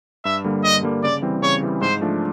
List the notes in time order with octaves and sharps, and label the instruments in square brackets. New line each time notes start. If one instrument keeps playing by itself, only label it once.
[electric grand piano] G2 [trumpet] E5
[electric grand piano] D3 G3 A#3
[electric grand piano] G2 [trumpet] D#5
[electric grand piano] D3 G3 A#3
[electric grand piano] C#3 [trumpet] D5
[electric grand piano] E3 G3 C4
[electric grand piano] C#3 [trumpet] C#5
[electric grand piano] E3 G3 C4
[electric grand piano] G#2 [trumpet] C5
[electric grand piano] F3 A3 D4